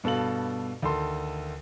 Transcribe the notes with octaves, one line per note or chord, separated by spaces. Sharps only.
G2 B2 A4 F5 F#7
D2 D#3 A4 C6